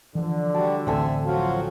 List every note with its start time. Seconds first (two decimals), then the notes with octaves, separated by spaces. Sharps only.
0.15 D3 E3 F3
0.55 G3 F#4 A5
0.87 A1 D2 C4 A4 E5 G#5
1.26 F3 F#3 F4 F#4